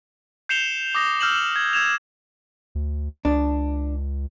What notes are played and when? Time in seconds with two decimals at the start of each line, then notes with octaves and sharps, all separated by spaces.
0.49 G6 C7 C#7 E7 F7 G7
0.95 D6 D#6 A#6
1.21 E6 F6 G6 E7 F#7
1.56 G#6
1.73 E6 G#6 E7 F7
2.75 D2
3.25 C#2 D4